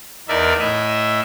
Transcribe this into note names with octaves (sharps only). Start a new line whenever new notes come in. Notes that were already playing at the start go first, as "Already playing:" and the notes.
E2 D#4 A#4 D5 E5
A2 D#5 E5